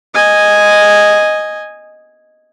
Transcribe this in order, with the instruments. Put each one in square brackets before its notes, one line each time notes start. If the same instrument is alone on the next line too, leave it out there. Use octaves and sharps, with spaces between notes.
[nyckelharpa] D#5 G#5